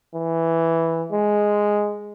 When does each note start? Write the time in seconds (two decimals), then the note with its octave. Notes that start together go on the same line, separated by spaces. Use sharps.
0.15 E3
1.12 G#3